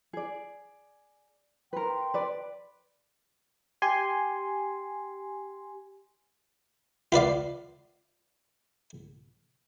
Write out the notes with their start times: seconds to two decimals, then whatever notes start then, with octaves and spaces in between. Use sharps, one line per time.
0.13 G#4 D5
1.73 A#4 B4 G5 C6
2.14 B4 D5
3.82 G4 G#5 C6
7.12 F4 B4 D5 F5